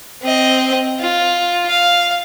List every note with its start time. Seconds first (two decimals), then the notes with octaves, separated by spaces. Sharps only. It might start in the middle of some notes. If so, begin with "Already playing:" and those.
0.22 C4 D#5
1.00 F4
1.69 F5